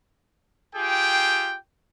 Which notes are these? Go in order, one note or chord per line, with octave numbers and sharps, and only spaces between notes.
F4 G4 G#4 G5